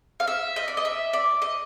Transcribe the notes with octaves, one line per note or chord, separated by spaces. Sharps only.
F5
E5
D#5
D5
D#5
E5
D5
D#5